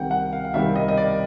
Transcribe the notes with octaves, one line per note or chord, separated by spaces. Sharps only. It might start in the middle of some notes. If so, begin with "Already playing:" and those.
Already playing: C2 C3 D#3 G3 F#5 G5
F#5
F5
F5
C2 C3 D#3 G3 E5
D#5
D#5
D5